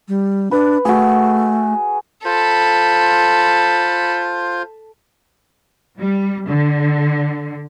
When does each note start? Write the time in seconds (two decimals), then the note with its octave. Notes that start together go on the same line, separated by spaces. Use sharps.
0.08 G3
0.51 D4 B4
0.85 A3 F#4 G#4
2.25 F4 A4 C5 B5
5.99 G3
6.47 D3